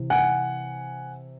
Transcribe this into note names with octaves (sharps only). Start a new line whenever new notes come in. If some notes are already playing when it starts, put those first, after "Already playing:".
Already playing: C3 E3
F#5 G#5